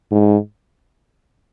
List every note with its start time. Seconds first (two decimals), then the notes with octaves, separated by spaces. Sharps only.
0.11 G#2